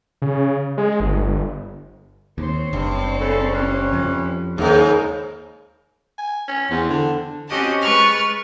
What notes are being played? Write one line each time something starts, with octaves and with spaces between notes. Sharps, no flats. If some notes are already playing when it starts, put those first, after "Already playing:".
C#3
G#3
G1
D#2 C4 C5 C#5
F#1 G2
C#3 E4 A4
E3 G3 C#4
F2
D#2 G#2 C#3 F#3 A#3 A4 A#4 D#5
G#5
C#4
E2 C4
D3
C4 C#4 F#4 G4 D#5 A5
G#3 B4 C#6 F6 A6